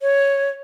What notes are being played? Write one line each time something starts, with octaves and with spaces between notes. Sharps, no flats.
C#5